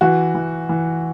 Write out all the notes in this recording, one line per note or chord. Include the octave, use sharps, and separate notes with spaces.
E3 F#4
E3
E3